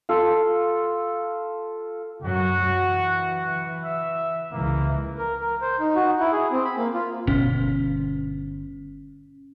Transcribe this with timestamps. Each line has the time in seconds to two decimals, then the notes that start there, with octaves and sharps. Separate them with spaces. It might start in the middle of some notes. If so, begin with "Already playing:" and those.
0.09 F4 A4
2.22 F#2 F#3 F#4
2.85 E3
3.83 E5
4.52 C#2 E3 A#3
5.18 A#4
5.40 A#4
5.62 C5
5.80 D#4
5.96 F#4
6.20 E4
6.32 G#4
6.51 C4
6.64 B5
6.77 A#3
6.94 F4
7.27 G1 B2 C#4